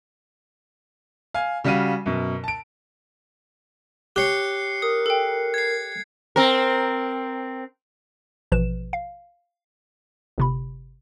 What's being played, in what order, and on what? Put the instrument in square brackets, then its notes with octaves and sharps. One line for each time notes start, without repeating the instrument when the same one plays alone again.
[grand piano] F5 G#5
C#3 G3 F#4 F5 D#7
F#2 B2
A5 D7
[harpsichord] G4 C#5 [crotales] F#6 C7 C#7
[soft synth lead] A#4 [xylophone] D#6
[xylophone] A4 G5
[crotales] G#6 C7
[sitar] C4 A#4
[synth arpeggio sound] A1 B2 F3 B4 E7
F5
G1 C3 B5